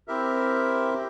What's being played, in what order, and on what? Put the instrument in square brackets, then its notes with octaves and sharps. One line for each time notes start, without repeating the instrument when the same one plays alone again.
[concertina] C4 E4 G4 A#4 E5
G4